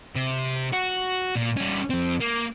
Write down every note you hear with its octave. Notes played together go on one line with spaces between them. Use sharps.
C3
F#4
A#2
G3 C#4
F2 C4
A#3